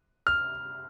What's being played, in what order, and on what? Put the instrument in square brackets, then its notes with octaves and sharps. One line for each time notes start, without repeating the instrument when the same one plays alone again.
[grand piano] F6